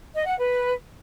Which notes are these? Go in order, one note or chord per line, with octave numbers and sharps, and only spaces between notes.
D#5
F#5
B4